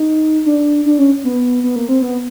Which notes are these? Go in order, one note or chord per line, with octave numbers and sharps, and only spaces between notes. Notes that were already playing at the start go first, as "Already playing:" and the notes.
Already playing: D#4
D4
D4
C#4
B3
B3
A#3
C4
B3